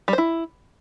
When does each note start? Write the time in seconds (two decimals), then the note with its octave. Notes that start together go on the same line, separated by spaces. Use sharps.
0.08 G3
0.13 C5
0.18 E4